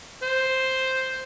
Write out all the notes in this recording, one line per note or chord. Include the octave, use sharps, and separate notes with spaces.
C5